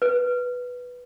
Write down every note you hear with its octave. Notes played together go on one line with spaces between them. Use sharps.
B4